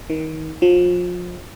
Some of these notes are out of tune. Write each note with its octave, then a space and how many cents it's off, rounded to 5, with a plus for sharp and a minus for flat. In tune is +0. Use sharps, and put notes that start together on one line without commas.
D#3 +25
F3 +30